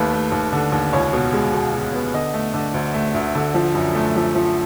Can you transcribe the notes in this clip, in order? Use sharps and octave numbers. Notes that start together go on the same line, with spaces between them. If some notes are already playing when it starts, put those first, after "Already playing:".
Already playing: D#2 A3 B4
A3
D#2
D3
D#2
C#2 C#5
B2
G#3
B2
B2
B3
D3 D#5
A3
D3
D2
A3
D2
D3
F3
F#2
A3
F3
F3